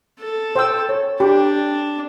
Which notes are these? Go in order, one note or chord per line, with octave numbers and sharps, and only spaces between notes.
A4
C5 G5 E6
C#5
D4 G4